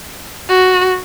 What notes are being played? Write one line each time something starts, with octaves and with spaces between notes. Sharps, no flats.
F#4